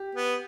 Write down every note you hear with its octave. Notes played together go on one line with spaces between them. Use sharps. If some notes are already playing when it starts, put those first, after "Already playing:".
Already playing: G4
B3